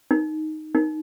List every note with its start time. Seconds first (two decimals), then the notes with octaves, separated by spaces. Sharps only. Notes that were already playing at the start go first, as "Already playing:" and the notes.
0.11 D#4
0.75 D#4